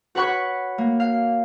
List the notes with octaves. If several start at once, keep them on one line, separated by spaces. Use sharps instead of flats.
F#4 B4 C#5 F#5 B5 C#6
A#3
F5